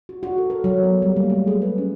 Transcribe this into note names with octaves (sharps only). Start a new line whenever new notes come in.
F#4
F#4
A4
A#4
F#3
B3
G3
A#3
A3
G#4
B4
C#4